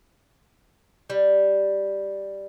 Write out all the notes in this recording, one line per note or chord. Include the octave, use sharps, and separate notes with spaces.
G3